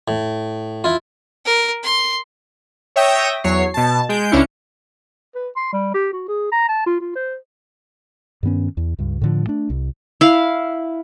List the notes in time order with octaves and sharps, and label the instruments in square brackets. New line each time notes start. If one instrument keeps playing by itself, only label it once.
[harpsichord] A2
E4 F4
[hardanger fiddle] A#4
C6
[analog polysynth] C#5 E5 G5 D#6 A#6
E2 F#3 C#5 C7
B2 A5
G#3 G6 D7
C#2 C#4 D4 E4 C#7
[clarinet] B4
C6
G3
G4
F#4
G#4
A#5
A5
F4
F4
C5
[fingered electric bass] G2 D#3 B3 C#4
E2
C#2 G2
A2 D3 F3
A3 D4
C2
[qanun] E4 F5